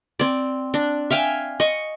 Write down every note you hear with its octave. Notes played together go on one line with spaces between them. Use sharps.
C4 D5
D4
E5 F5 G5 G#5
D#5 C#6